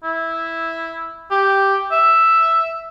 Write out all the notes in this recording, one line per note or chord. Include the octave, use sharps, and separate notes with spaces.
E4
G4
E5